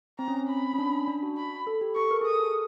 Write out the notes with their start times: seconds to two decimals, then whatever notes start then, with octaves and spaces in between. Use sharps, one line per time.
0.19 C4 A#5
0.28 C#4
0.36 C4
0.49 B5
0.73 C#4
0.78 D4
1.08 D4
1.23 F#4
1.37 B5
1.67 A4
1.81 G4
1.96 A4 C#6
2.11 A#4
2.21 G#4
2.25 A4 D#6
2.40 A4